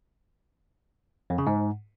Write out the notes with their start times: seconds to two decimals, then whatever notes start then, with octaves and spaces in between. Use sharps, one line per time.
1.30 F2
1.38 C#3
1.47 G#2